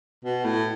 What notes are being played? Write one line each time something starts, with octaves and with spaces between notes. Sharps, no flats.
B2
A2